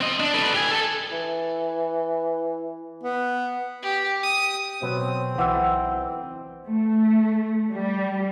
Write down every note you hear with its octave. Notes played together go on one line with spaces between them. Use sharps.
C4 D#5
D4
A4 B4
G4 G#5
A4
E3
B3
G4
D#6
B2 F#3 B3 C4
B1 E3 F#5 E6
A3
G3